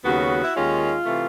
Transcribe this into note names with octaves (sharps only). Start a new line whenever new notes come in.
D#2 C#3 F#3 B3 F#4
E4
D#2 D#3 G#3 C#4 F4
C3 E3 A3